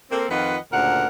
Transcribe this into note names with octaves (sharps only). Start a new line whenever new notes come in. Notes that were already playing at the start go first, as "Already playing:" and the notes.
A#3 C4 A4
F2 D#3 F4 B4 D#5 F#5
D2 A#2 C#3 A#4 F#5